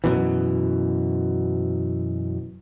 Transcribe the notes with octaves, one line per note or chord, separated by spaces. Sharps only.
F#2 B2 E3